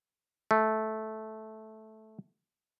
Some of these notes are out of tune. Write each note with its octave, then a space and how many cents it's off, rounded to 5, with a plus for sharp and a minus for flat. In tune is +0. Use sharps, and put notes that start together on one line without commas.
A3 -10